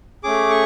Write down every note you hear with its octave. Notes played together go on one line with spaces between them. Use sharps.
A3 C#4 G#4 D6
C#6